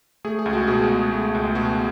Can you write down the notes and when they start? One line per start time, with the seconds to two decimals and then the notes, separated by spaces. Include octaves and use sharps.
0.25 A3 G#4
0.39 G#4
0.46 C#2
0.53 F#4
0.67 B2 G#4
0.90 C#2
1.12 A3
1.35 C#2
1.55 B2 F#4